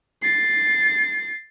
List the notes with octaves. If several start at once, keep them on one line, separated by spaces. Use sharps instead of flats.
A6 C7